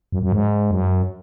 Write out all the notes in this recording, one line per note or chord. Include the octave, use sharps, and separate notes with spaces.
F#2
F#2
G#2
F#2